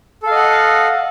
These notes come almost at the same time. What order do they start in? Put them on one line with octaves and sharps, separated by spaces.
A4 F5 D#5 F#5